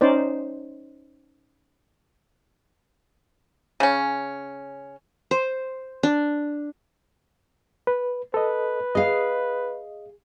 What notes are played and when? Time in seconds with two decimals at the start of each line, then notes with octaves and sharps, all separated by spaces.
0.01 C#4 D#4 C5 D5
3.80 C#3 C#4
5.31 C5
6.03 D4
7.87 B4
8.34 A4 B4 D#5
8.95 G#4 D#5 F5